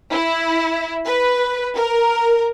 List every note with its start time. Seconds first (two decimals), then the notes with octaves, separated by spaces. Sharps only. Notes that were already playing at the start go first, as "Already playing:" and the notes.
0.11 E4
1.05 B4
1.76 A#4